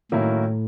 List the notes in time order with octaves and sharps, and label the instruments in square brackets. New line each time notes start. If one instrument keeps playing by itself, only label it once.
[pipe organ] A2 [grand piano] D#3 F#3 A#3 C#4 E4